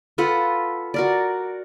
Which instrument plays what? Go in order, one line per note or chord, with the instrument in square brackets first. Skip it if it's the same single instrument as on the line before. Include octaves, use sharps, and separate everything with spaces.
[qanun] F4 A4 B4 F#5
F#4 A#4 D5